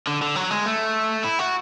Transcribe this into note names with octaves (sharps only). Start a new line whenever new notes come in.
D3
D3
F#3
G#3
A3
E4
F#4